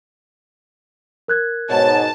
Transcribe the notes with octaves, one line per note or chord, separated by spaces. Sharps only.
A#4 F#6 G#6
G#2 B2 C#5 A5